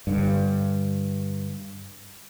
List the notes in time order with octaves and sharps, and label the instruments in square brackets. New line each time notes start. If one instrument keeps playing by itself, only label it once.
[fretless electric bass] G2 D3